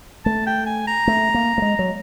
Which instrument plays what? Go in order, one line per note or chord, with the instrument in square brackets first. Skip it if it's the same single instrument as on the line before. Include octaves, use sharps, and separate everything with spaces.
[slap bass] A3 [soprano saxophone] A5
[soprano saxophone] G5
G#5
A#5
[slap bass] A3
A#3
A3
G#3
F#3